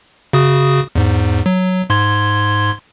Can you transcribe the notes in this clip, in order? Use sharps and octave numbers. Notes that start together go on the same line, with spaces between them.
C#3 F#4 D#6
E2 G#2
F#3
G#2 C6 G#6